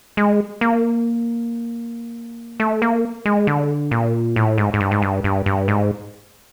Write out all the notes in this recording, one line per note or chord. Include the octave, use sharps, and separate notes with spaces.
G#3
A#3
A3
A#3
G#3
D3
A#2
A2
G#2
G#2
G2
G#2
G2
G2
G2
G#2